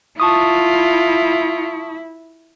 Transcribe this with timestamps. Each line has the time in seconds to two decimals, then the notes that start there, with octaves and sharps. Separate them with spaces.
0.20 E4 F4 A5 C#6 D#6